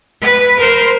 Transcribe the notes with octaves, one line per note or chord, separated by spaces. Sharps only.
B4
A#4 C5